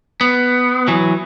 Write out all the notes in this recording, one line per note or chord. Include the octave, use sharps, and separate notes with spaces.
B3
E3 F#3